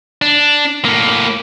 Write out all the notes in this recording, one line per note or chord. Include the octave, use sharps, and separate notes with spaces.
D4
A2 A#3